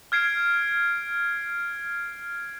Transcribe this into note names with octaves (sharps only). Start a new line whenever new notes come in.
F6 G#6 C7 D7